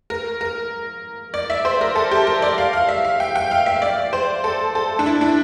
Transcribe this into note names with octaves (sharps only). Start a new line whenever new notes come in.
A#4
A#4
D5
E5
C5
A#4
A4
G4
A#4
D5
F5
F5
E5
F5
G5
G5
F5
E5
D5
C5
A4
A4
D4
E4
D4